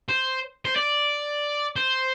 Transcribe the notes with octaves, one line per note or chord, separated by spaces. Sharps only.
C5
C5
D5
C5